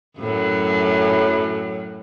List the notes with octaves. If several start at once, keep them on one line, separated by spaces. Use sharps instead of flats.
F#2 A2 F#3